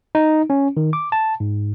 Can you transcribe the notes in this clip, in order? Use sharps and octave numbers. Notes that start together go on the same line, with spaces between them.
D#4
C#4
D#3
D6
A5
G#2